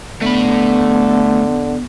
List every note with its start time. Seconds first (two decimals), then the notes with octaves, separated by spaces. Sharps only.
0.22 D3 A3 B3 B5